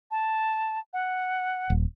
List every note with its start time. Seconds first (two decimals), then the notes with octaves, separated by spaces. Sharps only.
0.11 A5
0.93 F#5
1.70 D#1